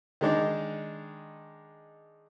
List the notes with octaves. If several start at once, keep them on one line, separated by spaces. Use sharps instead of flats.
D#3 G#3 D4 D#4